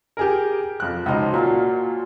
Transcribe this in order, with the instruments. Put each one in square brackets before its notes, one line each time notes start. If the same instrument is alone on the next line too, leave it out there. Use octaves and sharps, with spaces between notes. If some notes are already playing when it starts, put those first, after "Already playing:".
[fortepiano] G4 G#4 A#4
F2 F#6
[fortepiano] C#2 D#4 [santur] F#3 C5 A5
[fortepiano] A#2 [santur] F#3 F4 F5